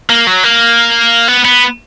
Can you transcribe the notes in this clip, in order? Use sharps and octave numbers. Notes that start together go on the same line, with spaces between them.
A#3
F#3
A#3
B3
B3